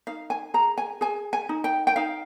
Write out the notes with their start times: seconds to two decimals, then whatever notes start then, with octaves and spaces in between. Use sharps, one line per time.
0.07 D#4 F5
0.30 G#5
0.54 G#4 A#5
0.78 G#5
1.01 G#4 G#5
1.33 G#5
1.49 D#4
1.64 G5
1.87 G5
1.96 D#4 F5